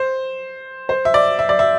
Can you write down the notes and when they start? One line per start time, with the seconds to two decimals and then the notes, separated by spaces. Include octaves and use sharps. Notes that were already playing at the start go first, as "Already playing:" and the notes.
Already playing: C5
0.89 C5
1.05 E5
1.14 D5
1.39 E5
1.49 D5
1.59 E5